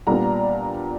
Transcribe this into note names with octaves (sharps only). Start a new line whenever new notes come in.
A#2 G3 B3 D4 A#5